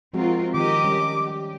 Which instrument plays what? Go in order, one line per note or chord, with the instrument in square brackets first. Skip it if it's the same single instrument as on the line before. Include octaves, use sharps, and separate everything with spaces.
[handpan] F3 G#3 F#4 [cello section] C4 F4 A#4
[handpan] D#3 [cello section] G4 A#4 D#5 [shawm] D6
[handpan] G3 C#4
[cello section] G4